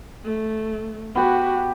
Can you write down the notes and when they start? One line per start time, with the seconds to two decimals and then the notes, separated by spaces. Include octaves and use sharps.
0.25 A3
1.15 B3 F#4 G4 B4